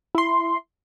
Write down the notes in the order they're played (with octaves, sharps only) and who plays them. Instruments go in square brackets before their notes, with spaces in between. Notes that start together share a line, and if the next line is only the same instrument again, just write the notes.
[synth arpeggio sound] E4 C6